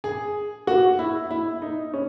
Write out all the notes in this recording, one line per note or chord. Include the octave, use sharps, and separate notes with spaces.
G#4
F#4
E4
E4
D#4
C#4